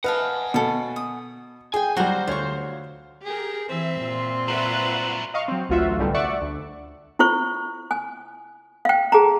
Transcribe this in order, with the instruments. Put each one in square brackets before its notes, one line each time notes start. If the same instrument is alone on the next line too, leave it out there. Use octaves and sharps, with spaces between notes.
[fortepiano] B4 [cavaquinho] D#5 F5 A5 [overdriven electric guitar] F#5 G#5
[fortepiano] B2 [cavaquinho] A4 C#5
[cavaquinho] D#6
[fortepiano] G#4 [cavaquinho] D#5 G5 [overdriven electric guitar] G#5
[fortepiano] F#3 G3 [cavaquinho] F#4 F5 A#5 [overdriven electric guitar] C5
[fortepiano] D2 C#5 [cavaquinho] F4 C#6
[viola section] G4 A#4 [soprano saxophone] G#4
[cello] E3 [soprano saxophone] C4 [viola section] E5
[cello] A#2 F4
[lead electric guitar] G2 F#3 [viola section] B4 E5 F#5
[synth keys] D#5 F5 C#6
F#3 C4
A1 D2 F#3 F4 F#4 E5
C2 G#2 D3 G3 A3 B3
D5 E5 F#5 C#6
D2
[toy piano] E4 F4 C5 C#6
G#5
F5 G5
G#4 A5 A#5